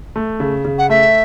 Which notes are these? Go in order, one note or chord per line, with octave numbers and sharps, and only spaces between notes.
A3
C#3
C#3
F#5
A3 E5